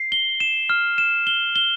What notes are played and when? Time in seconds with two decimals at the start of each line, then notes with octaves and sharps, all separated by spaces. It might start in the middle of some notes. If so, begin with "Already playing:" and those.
Already playing: C7
0.12 G7
0.40 E7
0.70 F6
0.98 E7
1.27 G7
1.56 G7